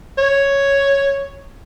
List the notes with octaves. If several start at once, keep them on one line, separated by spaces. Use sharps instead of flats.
C#5